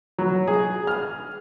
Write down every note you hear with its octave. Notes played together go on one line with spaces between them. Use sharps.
F#3
G#4
F6